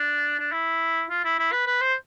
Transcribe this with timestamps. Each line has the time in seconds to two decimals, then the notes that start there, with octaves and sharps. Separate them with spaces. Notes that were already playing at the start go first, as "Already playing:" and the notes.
Already playing: D4
0.40 D4
0.52 E4
1.10 F4
1.24 E4
1.39 E4
1.52 B4
1.67 B4
1.81 C5